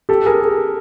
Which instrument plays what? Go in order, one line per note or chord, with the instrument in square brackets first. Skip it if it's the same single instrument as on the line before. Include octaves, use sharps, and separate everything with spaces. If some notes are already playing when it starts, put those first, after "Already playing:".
[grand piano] G4 A4
G#4 A#4